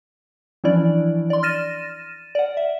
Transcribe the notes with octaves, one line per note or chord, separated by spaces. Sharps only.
E3 F3 C#4 D4 E4 D5
D5 C6
F6 A6 A#6 D#7 E7
D5 F#5
E5